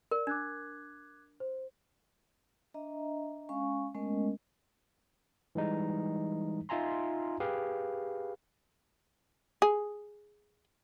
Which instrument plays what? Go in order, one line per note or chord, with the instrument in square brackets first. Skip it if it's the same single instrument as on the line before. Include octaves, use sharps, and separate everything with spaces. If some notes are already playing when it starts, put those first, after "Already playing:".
[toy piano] A#4 [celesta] D5
[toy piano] D4 [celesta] D6 F#6 G#6
[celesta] C5
[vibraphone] D4 D#5 E5 A#5
G#3 C#4 F5 G#5 C#6
G#3 A3 B3 C#4 A#4 D#5
[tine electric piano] E3 G3 G#3 D#4
D#4 F4 E5 G#5 A#5 C6
G4 G#4 B4 F5
[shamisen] G#4